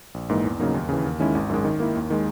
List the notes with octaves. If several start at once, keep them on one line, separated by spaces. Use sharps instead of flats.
A#1
G#2 E3 A#3 D#4
E2
C#3 F#3 A#3 D#4
D#2
C#3 E3
D#2
D#3 G#3 C#4 E4
G#1
F#2 D#3 G#3
D#3
A#3 E4
D#2
D#3 G#3